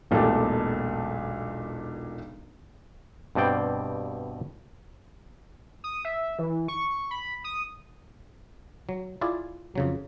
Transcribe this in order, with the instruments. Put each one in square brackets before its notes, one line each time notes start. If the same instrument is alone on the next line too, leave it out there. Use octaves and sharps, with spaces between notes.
[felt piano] E1 B1 A#2 A3 G4 A4
[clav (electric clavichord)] G2 B2 C4 D5 G5
[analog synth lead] D#6
E5
E3
C#6
B5
D#6
[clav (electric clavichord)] F#3
E4 F4 G#4 D5
F2 C#3 F#3